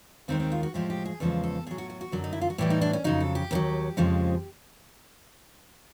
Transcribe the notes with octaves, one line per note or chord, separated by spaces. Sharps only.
D#2 D#3 G#3 C4
C4
F4
F#4
A2 F3 G#3 G4
G4
G#4
E2 C#3 F3 G#3 A4
A4
A2 F#3 G#4
F#4
F#4
F#4
F#2 D3 F#3
D#4
E4
F4
F#4
A2 E3 G3 G4
D#4
D4
C#4
F2 C#3 F#3 D#4
A4
G4
D#2 D#3 F#3
F2 C#3 F3 G#3